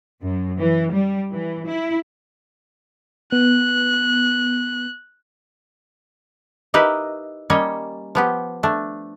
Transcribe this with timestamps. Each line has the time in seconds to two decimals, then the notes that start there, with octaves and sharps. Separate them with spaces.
0.22 F#2
0.60 E3
0.92 G3
1.31 E3
1.67 E4
3.32 B3 F#6
6.74 D#4 E4 G4 A#4 B4 D#5
7.50 G3 A#3 C#4 C#5 D#5
8.15 F3 B3 G4
8.63 A3 D4